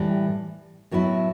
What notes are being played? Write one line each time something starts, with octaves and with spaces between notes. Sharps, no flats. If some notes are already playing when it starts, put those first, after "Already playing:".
Already playing: A2 E3 G3
A2 F#3 B3 E4